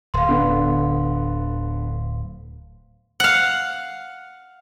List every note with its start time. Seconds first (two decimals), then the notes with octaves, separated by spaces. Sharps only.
0.14 D1 F5 C6
0.29 D3 B3
3.20 F5 F#5